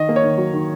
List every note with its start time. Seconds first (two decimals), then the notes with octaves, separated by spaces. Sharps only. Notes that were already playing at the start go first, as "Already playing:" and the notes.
Already playing: D#3 D#5
0.09 A#3
0.16 C#5
0.24 D#3
0.38 F#3
0.53 D#3